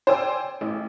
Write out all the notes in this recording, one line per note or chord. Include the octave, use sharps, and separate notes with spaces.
C5 D5 G5 G#5 E6
A1